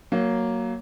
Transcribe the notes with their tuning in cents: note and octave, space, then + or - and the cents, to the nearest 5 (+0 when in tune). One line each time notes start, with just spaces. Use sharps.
F#3 +10 A#3 +0